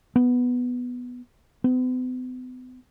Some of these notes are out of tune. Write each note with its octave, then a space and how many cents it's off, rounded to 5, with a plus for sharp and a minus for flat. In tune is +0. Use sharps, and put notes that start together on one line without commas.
B3 +0
B3 +45